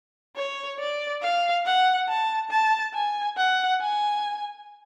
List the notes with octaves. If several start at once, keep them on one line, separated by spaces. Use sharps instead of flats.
C#5
D5
F5
F#5
A5
A5
G#5
F#5
G#5